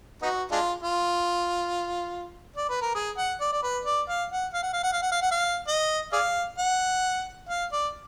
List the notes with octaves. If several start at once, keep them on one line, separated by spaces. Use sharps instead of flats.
B3 D#4 F#4
G#3 D4 F4
F4
D5
B4
A#4
G#4
F#5
D5
D5
B4
D5
F5
F#5
F5
F#5
F5
F#5
F5
F#5
F5
F#5
F5
D#5
G#4 D5 F5
F#5
F5
D5